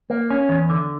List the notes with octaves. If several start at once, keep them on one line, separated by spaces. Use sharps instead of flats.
A#3
C#4
E2
D3